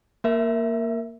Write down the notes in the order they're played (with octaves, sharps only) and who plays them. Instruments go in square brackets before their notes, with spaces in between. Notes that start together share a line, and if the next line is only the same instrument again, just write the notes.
[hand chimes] A#3 A#4 E5